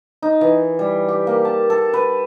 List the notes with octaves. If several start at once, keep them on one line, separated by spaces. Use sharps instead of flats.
D#4
E3
G3
G4
A#3
A5
A4
B4